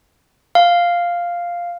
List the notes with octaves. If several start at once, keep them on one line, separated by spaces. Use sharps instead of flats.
F5